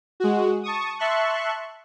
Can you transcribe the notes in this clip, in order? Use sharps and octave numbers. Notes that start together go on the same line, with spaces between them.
G#3 F#4
A5 C#6 D#6
E5 A5 C6 C#6 F#6